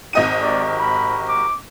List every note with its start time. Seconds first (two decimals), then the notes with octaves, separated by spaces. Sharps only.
0.13 G#1 D#4 D#5 F#5 D#7
0.42 F#4 G4 A#4 D5
0.80 B5
1.28 D6